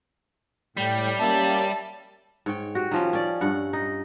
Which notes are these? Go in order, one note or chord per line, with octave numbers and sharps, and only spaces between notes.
A2 G3 G5
A#3 C#4 G4 E5 A5
G#2 C#5 G5
F#4 G4
D#3 F3 C#4
C#4 D5
G2 F#5
D#4